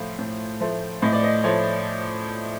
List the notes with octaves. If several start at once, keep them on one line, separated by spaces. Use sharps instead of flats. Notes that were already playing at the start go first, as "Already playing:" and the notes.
Already playing: A2 F3 A3 F5
A2
F3 A3
A2 D#5
D5
D#5
F3 A3 C#5